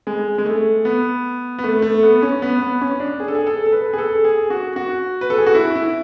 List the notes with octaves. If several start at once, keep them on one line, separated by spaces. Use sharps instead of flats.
G#3
G#3
A3
B3
B3
A3
A3
B3
C#4
B3
B3
C#4
D4
G#4
A4
G#4
A4
A4
B4
G#4
A4
G#4
F#4
F#4
B4
A4
G#4
F#4
E4
E4